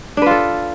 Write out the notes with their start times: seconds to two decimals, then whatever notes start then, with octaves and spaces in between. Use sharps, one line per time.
0.17 D4
0.22 B4
0.26 F4
0.31 A4